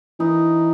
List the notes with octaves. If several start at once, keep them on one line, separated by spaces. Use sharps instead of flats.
E3 D#4